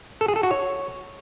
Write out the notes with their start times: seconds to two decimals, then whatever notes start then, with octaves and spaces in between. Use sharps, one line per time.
0.21 A4
0.28 G#4
0.36 A4
0.43 F#4
0.51 C#5